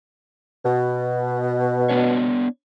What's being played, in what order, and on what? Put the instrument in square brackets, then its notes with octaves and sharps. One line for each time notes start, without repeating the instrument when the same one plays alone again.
[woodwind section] B2
[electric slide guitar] B3 D4 C#5